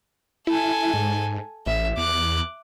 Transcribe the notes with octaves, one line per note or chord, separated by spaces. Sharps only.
E4 A4 G#5
G#2
A1 E5
E2 D6 F#6